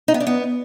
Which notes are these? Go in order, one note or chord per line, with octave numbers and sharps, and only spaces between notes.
D#4
B3
D4
B3